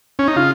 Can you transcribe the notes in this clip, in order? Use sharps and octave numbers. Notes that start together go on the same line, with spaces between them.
C#4
D#4
C#3 F4